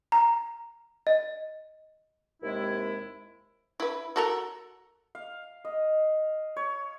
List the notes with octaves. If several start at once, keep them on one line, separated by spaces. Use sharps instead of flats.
A#5
D#5
D#2 C3 G#3 E4
E4 B4
F#4 A4 A#4
F5
D#5
C#5